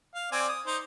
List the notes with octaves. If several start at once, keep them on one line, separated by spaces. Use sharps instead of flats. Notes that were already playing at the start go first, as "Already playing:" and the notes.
F5
C4 D5 G#5
D#6
D#4 C5